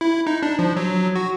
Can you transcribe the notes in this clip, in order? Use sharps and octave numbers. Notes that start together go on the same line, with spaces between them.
E4
D#4
D4
F3
F#3
F#4